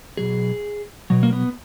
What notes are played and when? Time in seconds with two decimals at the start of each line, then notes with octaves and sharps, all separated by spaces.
0.17 B2 F#3 G#4
1.10 B2 F#3
1.23 A#3
1.33 B3